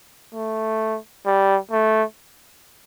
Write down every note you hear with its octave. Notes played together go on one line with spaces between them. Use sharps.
A3
G3
A3